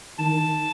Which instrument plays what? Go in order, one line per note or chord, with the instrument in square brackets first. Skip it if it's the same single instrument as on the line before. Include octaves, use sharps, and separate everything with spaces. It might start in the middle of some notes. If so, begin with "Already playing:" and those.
[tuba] D#3 [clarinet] A5